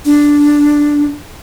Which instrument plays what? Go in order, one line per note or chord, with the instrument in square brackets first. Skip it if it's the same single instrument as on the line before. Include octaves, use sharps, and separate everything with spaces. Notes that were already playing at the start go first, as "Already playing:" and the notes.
[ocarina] D4